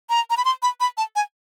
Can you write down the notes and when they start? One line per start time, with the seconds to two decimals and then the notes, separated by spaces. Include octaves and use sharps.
0.10 A#5
0.30 A#5
0.37 B5
0.45 C6
0.62 B5
0.80 B5
0.97 A5
1.16 G#5